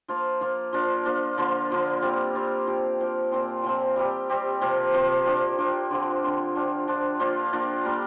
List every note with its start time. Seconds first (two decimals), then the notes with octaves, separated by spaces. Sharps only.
0.08 F3 A#3 F4
0.41 F3 A#3 F4
0.73 F3 A#3 D4
1.05 F3 A#3 D4
1.37 D3 F3 A#3 F4
1.70 D3 F3 A#3 F4
2.02 G3 C4 F4
2.35 G3 C4 F4
2.67 F3 C4 G4
3.00 F3 C4 G4
3.32 A#2 F3 C4
3.64 A#2 F3 C4
3.96 G3 C4 G4
4.29 G3 C4 G4
4.61 C3 F3 A#3
4.94 C3 F3 A#3
5.26 F3 D4 G4
5.58 F3 D4 G4
5.90 D3 F3 C4 F4
6.23 D3 F3 C4 F4
6.55 F3 D4 F4
6.88 F3 D4 F4
7.20 F3 A#3 D4 F4
7.52 F3 A#3 D4 F4
7.85 G3 A#3 D4